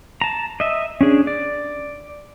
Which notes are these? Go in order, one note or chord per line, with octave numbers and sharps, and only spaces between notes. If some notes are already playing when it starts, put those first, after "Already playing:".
A5 A#5
D#5 E5
C#4 D4 G#4
D5